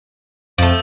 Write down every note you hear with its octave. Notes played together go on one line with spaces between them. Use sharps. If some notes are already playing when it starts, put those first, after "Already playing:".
F2 F3 A3